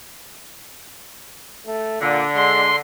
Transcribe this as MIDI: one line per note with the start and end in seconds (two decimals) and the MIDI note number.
1.67 2.01 57
2.01 2.23 46
2.01 2.80 50
2.36 2.71 56
2.36 2.76 84